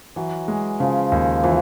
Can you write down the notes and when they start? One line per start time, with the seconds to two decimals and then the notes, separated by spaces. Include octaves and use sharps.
0.16 E3 F#3
0.48 G#3
0.80 C#3 F3
1.12 D#2
1.43 E3 F3